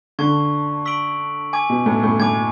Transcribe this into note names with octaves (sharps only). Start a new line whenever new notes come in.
D3 A5 C#6 G#6
C#6 E6 B6 D7 F#7
G#5 D6 G#6
B2
A2
A2
A2 G#5 D6 G#6